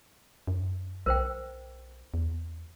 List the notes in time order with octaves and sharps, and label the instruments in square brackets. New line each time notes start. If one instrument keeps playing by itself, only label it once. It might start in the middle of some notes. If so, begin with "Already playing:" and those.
[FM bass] F#2
[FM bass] B1 [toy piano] A#4 C5 G5
[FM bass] E2